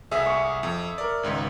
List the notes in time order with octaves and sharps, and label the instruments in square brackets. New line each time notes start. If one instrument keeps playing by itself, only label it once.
[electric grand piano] C2 G#4 D#6 [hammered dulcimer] E5
[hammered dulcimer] C#6
[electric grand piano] F2
A#4 D5
G#1 C#2 G#2